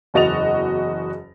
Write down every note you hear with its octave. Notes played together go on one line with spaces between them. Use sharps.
F#1 E2 F#4 D#5 A6 F7